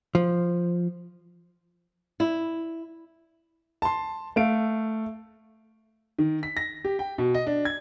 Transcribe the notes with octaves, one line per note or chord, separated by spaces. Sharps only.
F3
E4
A5 C6
A3 F5 D7
D#3
B6
A#6
G4
G5
B2
D#5
D4
G#6